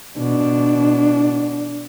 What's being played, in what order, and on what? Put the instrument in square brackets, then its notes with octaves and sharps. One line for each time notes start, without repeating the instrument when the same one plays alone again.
[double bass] B2 [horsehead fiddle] D4